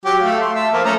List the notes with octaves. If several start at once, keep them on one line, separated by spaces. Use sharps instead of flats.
F#3 G4
A3 F5
C6
E5 A5
F3 A#3 F4
A3 C#4 A#5